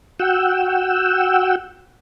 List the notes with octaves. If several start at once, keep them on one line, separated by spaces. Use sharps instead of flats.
F#4 F#5 G5 E6